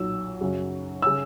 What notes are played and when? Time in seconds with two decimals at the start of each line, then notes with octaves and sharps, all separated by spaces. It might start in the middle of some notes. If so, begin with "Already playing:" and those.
Already playing: B1 A#2 F#3 E6
0.41 F#2 C#3 F#3
1.02 C#3 E6